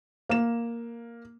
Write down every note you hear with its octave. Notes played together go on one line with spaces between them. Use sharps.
A#3 E7